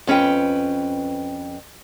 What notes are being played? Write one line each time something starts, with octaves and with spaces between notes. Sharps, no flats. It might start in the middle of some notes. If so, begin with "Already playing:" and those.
F2 C#4 B4 G5